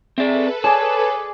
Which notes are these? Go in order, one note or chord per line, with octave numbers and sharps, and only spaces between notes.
C4 G#4 A4 B4 D5 E5
G#4 C#5 D5 G#5 A5